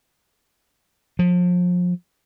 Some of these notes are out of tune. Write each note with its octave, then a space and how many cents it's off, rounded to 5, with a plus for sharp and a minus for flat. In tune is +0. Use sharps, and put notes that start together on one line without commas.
F3 +30